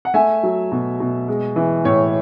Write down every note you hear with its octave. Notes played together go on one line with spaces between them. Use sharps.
F#5
A3 E5 G#5
F#3
B2
B2
G#3
E3
A2 C#5 E5